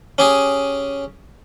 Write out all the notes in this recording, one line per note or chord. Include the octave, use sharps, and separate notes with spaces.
C#4 G4 G#4